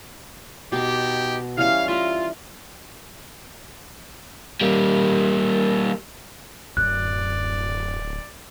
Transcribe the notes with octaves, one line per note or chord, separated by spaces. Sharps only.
B2 D#4 G4 D6
E3 G3 C#4 F5
F4 E5 A#5
G3 A#3
D1 F#2 D5 F#6